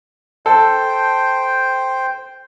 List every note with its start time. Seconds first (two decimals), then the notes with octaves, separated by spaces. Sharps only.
0.46 A4 C5 G5